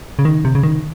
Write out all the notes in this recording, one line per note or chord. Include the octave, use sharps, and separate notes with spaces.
C#3
D#3
C3
C#3
D#3